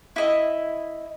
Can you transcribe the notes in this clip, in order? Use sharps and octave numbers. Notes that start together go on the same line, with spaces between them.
E4 D#5